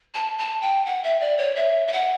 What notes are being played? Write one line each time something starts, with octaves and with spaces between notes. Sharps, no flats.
A5
A5
G5
F#5
E5
D5
C#5
E5
E5
F#5